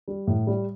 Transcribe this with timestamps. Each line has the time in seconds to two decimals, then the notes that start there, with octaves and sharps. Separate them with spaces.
0.08 G3
0.27 A2
0.47 G3